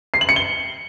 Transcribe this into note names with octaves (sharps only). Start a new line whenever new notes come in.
C7
F#7
C#7
G7